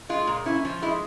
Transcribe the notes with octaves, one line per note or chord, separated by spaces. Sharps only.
G#3 F4
A#2
C#4 E4
F3
G#3 E4